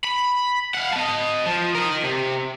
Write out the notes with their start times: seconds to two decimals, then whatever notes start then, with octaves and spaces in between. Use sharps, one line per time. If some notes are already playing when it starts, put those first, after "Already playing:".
0.04 B5
0.74 F5 F#5
0.92 D#5 A5
1.46 F3
1.75 A#4 D#5
2.04 C3